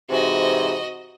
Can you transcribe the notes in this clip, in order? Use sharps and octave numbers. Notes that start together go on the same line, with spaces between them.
G#2 C3 E3 F#4 D#5